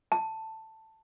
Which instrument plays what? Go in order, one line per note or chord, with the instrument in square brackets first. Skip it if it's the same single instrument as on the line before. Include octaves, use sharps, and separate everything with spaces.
[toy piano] A5